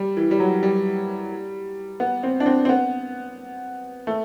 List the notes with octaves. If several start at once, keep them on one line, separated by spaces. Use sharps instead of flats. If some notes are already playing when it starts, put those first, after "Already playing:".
Already playing: G3
E3
G3
F#3
G3
B3
C4
D4
C4
C4
B3
A3